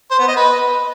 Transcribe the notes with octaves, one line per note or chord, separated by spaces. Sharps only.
C5
B3
D#5
B4